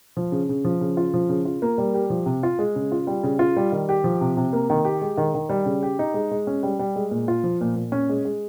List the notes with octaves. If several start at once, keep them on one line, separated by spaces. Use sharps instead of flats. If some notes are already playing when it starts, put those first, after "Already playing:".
F3
C#3
C#3
F3
C#3
F4
F3
C#3
F4
A#3
G3
G4
F3
C3
F4
G#3
C#3
F4
G3
C#3
F4
G3
D#3
G4
F3
C3
C3
A#3
D#3
G4
G#3
D#3
D#3
G3
C#3
G4
D#4
G#3
G#3
C#4
G3
G3
G#3
A#2
F4
F3
A#2
A#2
C#4
G#3
G#3